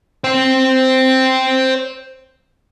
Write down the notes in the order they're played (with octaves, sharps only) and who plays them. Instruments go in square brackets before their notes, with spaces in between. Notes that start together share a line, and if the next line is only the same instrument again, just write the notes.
[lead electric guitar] C5 G5